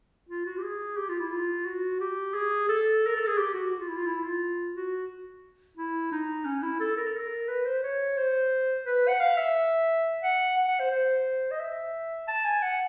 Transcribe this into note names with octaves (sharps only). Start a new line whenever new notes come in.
F4
F#4
G4
G#4
G4
F4
E4
F4
F#4
G4
G#4
A4
A#4
A4
G#4
G4
F#4
F#4
F4
E4
F4
E4
F4
F#4
E4
D#4
C#4
E4
A4
A#4
A4
A#4
B4
C5
C#5
C5
B4
F#5
F5
E5
F#5
F#5
F#5
C5
C5
D#5
E5
A5
G#5
F#5